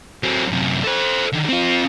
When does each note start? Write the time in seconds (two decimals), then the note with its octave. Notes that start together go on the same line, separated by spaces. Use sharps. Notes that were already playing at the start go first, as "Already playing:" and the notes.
0.23 F#3 C4
0.52 F#2 C3
0.84 A4 C5
1.33 D3 D#3
1.49 C4 F4